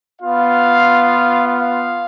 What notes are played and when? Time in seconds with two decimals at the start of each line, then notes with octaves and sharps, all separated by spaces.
0.20 B3 F4 F5
1.47 F5